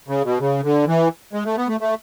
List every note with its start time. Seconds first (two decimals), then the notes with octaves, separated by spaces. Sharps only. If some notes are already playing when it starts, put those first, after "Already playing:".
0.08 C#3
0.25 B2
0.40 C#3
0.64 D3
0.87 E3
1.33 G#3
1.45 A3
1.57 B3
1.68 A3
1.81 A3